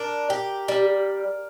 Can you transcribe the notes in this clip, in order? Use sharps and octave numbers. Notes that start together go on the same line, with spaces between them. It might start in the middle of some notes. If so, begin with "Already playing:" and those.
Already playing: D4 A#4
G4
G3